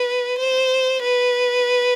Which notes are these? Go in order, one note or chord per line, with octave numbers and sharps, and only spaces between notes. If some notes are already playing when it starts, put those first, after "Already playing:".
Already playing: B4
C5
B4